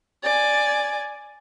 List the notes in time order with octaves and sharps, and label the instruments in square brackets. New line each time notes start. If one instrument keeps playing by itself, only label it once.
[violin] D5 G#5